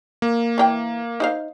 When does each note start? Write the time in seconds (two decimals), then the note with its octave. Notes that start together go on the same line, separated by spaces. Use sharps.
0.22 A#3
0.58 E3 D#4 G5
1.20 D#4 C5 F5